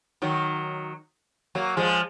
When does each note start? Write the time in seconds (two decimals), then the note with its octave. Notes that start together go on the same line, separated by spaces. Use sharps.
0.22 D#3 F#3
1.55 F#3 A#3
1.77 F3 G#3